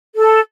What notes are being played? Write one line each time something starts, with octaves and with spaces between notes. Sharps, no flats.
A4